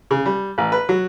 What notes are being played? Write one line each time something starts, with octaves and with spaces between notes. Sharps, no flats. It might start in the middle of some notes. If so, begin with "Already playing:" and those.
C#3
G3
A1
B4
F#3